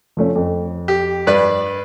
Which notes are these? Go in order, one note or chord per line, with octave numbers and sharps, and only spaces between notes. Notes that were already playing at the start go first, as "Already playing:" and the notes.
F3 A3 C#4
F2
G4
G2 B4 D5